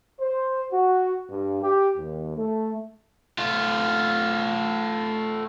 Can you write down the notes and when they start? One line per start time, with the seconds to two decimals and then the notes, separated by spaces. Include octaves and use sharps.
0.20 C5
0.73 F#4
1.30 G2
1.63 G4
1.97 D#2
2.38 A3
3.38 A3 F4